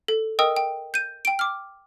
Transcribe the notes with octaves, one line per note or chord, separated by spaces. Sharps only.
A4
A#4 D#5 G5 D#6 E6
G5
G6 D#7
G5 D7
D6 F6